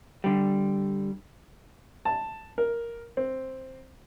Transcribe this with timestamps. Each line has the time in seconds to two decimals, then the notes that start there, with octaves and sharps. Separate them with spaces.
0.24 D3 G3
2.05 A5
2.58 A#4
3.17 C4